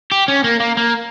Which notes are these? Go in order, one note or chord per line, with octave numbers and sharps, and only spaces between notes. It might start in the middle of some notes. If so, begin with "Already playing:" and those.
G4
C#4
A#3
A#3
A#3